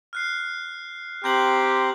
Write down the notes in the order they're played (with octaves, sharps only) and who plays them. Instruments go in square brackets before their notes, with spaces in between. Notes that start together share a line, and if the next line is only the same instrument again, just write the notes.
[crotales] F6 F#6 C7
[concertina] C4 A#5 C6 [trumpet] G4 [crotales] F#6 G6 F#7